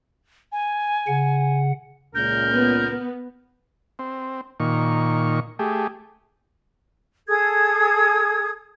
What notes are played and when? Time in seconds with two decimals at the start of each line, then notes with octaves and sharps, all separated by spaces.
0.52 G#5
1.07 C#3 F#5
2.15 C#2 A#2 A#4 G6
2.50 B3
3.99 C4
4.60 A#2 D#3 C#6
5.59 A3 G4 G#4
7.28 G#4 A4 D#6 G#6